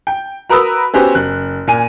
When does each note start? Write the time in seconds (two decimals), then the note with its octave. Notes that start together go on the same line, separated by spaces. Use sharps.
0.07 G5
0.49 F#4 A#4 B4 D#6 E6
0.94 B3 C#4 F#4 G4 C5
1.15 F#1 F#6
1.67 A#2 G#5 D#7